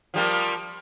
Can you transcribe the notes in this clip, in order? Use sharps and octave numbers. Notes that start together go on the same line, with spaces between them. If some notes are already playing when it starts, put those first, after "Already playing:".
F3 G3 A#3